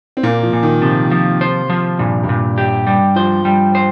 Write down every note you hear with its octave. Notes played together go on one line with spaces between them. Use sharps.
C4
A#2 A#3
F3
A#2
D#3
C3 F3
F3
C5
F3
G2 A#2
G2
A#2
G4
G3
F3 C5
G3
C5